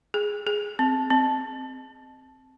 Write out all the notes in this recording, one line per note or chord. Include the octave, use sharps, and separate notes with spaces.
G#4
G#4
C4
C4